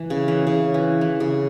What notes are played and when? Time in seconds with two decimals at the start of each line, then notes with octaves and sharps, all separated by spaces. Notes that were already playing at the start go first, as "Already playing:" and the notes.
Already playing: E3
0.10 C#3
0.28 E3
0.47 C#3
0.74 E3
1.01 E3
1.20 C#3